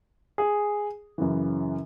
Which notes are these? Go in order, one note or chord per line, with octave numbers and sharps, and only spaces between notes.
G#4
F#2 C#3 E3